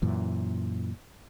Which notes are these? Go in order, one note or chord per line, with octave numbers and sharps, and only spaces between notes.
F#2 A#2 E3